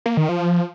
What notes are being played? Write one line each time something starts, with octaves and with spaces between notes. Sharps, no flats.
A#3
D#3
F3